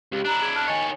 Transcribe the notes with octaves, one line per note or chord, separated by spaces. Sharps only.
C#2 G4
D4 E4 A#5 F#6
G#4 G#6
A5 F6 F#6
D#3 C#5 D#5 G#5 A6